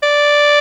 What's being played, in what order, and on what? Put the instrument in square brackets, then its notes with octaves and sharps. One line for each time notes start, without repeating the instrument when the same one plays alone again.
[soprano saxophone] D5